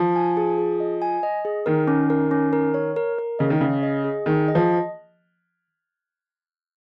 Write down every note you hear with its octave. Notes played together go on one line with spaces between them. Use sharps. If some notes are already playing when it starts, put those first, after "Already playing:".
Already playing: F3
G#5
G#4
G#4
D#5
G#5
D#5
G#4
D#3 A#4
C#4
A#4
C#4
A#4
C#5
A#4
A#4
C#3 D#5
D#3
C#3 G#4
D#5
G#4
D#3 G#4
D#5
F3